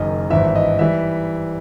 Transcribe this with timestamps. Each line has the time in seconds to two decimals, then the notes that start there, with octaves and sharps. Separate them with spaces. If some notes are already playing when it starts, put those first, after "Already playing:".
Already playing: F#1 F#2 D#3 D#5
0.30 G#1 G2 E3 E5
0.56 D#5
0.79 E3 G3 E5